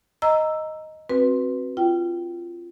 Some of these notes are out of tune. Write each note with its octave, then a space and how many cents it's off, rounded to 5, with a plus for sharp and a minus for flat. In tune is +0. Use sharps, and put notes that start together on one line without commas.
D#5 +5 A#5 +0 E6 +5
C4 +20 F#4 +0 B4 +0
F4 -20 G5 -20